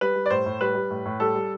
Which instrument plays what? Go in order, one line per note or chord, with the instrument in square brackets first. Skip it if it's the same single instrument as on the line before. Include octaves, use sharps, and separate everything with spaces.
[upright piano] G3 B4
G3
D5
A2 C5
A2
G3 B4
G3
A2
A2
G3 A4
G3